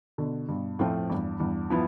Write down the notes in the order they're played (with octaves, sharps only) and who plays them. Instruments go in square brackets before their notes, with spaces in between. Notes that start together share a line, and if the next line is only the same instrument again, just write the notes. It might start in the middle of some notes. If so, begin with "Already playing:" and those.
[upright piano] B2 D3
G2 B2
[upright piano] F2 A2 [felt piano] F3 A3 C4 F4
[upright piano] E2 G2
E2 G2
[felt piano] F3 B3 E4